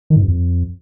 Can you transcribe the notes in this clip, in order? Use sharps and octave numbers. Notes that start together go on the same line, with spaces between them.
D#3
G#2
F#2
F2